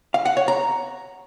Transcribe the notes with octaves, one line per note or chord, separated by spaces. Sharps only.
F5
F#5
C#5
A#5